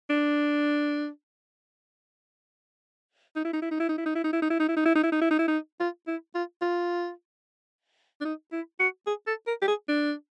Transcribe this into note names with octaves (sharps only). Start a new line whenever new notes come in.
D4
D#4
E4
D#4
E4
D#4
E4
D#4
E4
D#4
E4
D#4
E4
D#4
E4
D#4
E4
D#4
E4
D#4
E4
D#4
E4
D#4
E4
D#4
F4
E4
F4
F4
D4
D#4
E4
F#4
G#4
A4
A#4
G4
G#4
D4